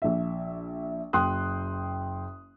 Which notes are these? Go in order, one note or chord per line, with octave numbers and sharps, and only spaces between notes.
A#1 E5
F#1 G5 C6 D#6 F#6